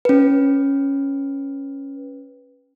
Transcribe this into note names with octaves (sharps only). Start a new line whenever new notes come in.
C#4 B4